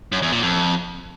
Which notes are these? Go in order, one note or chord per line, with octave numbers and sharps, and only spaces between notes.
F#2
E2
A#2
F2